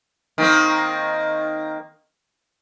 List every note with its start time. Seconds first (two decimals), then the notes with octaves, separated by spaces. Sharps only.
0.38 D#3 A#3 C4